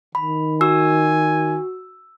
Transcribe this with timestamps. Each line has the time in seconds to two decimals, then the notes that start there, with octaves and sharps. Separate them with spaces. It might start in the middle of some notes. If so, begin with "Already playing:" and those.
0.15 D#3 B5
0.61 F#4 G#5 E6